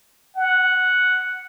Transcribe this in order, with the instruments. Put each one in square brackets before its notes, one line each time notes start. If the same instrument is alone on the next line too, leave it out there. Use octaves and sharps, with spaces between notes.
[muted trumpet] F#5